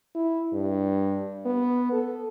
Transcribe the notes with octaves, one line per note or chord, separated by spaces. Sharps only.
E4
G2
B3
A4